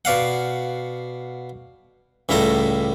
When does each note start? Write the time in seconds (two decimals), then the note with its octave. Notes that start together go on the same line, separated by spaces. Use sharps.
0.05 B2 D5 F5 F#5
2.29 C#2 A2 G3 E4 A4 A#5